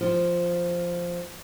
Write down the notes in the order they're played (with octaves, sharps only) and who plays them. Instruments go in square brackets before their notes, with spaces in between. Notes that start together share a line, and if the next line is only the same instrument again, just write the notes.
[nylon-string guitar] F3 F4